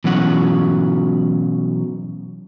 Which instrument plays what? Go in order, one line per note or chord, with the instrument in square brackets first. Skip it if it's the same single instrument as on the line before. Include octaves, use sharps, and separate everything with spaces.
[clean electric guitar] B2 E3 F#3 C#4 F#5